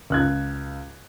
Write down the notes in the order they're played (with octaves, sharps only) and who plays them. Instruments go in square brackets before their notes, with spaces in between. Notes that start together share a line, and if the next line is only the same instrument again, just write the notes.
[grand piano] C#2 F#6 G#6